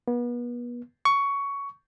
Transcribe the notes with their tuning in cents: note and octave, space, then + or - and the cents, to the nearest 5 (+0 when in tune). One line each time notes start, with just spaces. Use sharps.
B3 -35
C#6 +15